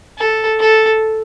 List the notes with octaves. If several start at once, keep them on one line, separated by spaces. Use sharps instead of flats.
A4
A4